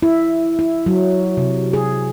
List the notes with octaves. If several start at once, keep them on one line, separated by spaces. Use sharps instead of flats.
E4
E4
F#3
C3
G#4